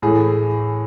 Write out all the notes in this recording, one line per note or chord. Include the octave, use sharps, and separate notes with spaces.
A2 E3 A3 G#4